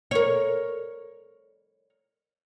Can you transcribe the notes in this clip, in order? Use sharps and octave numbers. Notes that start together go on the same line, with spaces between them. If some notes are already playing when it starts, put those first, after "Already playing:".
A#4 C#5